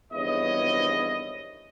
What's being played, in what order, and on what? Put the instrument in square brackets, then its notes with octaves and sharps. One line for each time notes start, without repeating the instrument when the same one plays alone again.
[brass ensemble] G#1 E2 G2 E4 C#5 D#5